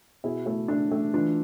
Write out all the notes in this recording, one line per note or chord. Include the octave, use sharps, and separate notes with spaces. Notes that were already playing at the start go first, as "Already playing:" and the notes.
B2 E4 G#4
A3 E4
A3 D4
A3
E3 D4 F4